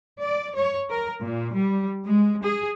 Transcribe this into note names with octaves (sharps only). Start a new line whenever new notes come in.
D5
C#5
A#4
A#2
G3
G#3
G#4